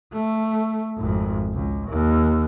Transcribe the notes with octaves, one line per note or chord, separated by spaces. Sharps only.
A3
G#1 F2
C#2
D#2